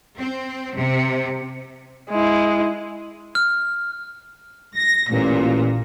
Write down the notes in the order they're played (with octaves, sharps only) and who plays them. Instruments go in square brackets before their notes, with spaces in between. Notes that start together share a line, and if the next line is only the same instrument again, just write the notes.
[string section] C4
C3
[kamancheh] G#3 E4
[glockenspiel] F6
[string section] A#6
[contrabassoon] A1 [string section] A#2